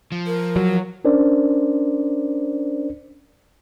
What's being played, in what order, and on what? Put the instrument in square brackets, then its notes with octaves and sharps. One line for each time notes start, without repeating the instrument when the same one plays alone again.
[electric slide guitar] F3
[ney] A#4
[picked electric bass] F#3
[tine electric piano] C#4 D4 A#4 C5 D5